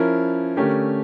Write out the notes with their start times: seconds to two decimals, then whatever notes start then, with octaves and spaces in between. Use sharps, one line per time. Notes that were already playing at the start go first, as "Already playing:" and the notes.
Already playing: F3 C#4 E4 A#4
0.56 D3 A3 C#4 G4 A#4